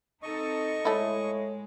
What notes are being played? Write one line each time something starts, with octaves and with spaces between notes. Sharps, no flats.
C4 D#4 A4 D#5 C#6
A2 G#3 A3 E4